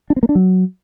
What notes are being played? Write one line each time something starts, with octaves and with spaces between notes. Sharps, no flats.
D4
C4
A#3
D4
F#3